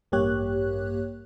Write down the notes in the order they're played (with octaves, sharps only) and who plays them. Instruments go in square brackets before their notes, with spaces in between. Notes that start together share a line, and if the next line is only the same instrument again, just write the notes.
[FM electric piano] A1 G2 A#3 G4 C#5 F#6